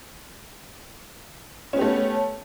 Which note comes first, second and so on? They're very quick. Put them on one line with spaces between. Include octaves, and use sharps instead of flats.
C#4 B3 G4 A3